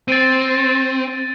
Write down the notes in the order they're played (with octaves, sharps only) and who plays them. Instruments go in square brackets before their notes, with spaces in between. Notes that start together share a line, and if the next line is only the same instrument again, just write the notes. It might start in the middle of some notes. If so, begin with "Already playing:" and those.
[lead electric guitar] C4 [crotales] A6 D7 D#7